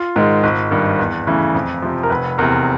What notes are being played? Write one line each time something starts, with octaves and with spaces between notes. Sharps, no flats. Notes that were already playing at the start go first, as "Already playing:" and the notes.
Already playing: F4
G#2 D#3 G#3
G#1
G2 D#3
E2
C#3 E3 A3
F2
C3 F3
A#4
F1 B4
E2 C3 A#4